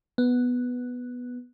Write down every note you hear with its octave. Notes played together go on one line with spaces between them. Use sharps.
B3